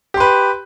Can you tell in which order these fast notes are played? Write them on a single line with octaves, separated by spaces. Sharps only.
G4 C6 B4